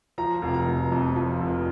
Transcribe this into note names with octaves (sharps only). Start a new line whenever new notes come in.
F3 A#5
F1
A#5
F1
F2
F3
F1